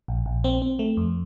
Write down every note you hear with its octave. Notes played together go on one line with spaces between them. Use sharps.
A#1
A#1
C4
C4
A3
F2